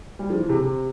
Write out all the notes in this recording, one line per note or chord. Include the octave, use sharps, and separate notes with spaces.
G3
F3
E3
C3
C3